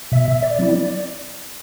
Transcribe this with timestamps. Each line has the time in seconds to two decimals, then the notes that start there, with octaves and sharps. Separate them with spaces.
0.12 B2 E5
0.42 D5
0.59 F#3 C4 E4
0.73 D5